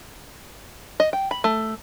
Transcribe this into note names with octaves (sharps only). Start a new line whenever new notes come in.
D#5
G5
B5
A3